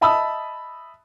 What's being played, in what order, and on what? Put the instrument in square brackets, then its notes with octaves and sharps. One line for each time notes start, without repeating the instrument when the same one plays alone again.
[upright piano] D#5 E5 A5 B5 D#6 E6